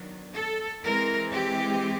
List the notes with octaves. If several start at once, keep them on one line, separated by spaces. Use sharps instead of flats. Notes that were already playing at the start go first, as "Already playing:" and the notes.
Already playing: D#3 F#3 B3 D4
A4
E3 G#3 C4 A#4
G4